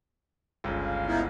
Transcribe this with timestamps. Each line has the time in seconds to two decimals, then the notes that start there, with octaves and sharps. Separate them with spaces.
0.64 G1 C#2 F4
0.85 F5
1.06 B3 D#4 E4